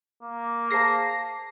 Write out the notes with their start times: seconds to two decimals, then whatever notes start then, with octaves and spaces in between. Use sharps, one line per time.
0.23 A#3
0.71 G#4 C5 A5 A#6 C7